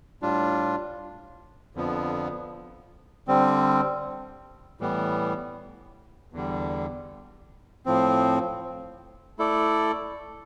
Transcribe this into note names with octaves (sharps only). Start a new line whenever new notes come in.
A2 G3 D4 F4
F2 D3 F3 B3
D3 G3 C4
A2 E3 G3 B3
E2 D3 G3
A2 F3 C4
A3 E4 A4 D5